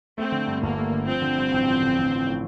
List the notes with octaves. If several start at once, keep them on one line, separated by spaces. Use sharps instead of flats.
A3 C4
D3
G2
G1 A#3
A3
D3
F3 C4
D3
G2
A1
F3
D3
A1
F3
A2